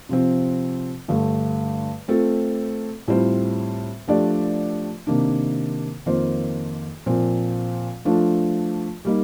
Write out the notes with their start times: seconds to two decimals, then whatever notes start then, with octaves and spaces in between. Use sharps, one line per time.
0.09 C3 F3 C4
1.08 G2 D3 A3
2.08 A3 C4 F4 A4
3.08 A2 G3 C4 F4 C5
4.08 F3 A3 D4 G4 D5
5.07 C3 D#3 A#3 D4
6.06 F2 D#3 A#3 F4 C5
7.06 A#2 F3 C4
8.05 F3 A3 D4 F4
9.05 G3 A#3 D#4